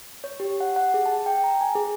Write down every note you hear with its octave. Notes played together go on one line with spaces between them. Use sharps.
C#5
G4
F#5
F#5
G#4
A5
G5
A#5
G#5
G#4